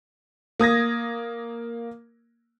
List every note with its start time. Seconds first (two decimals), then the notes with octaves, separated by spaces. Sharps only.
0.60 A#3 D#6 G#6 A#6